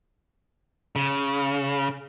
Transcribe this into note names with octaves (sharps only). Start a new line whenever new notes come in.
C#3